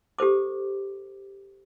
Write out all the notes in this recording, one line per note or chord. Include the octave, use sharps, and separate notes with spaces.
G4 A4 C5 D6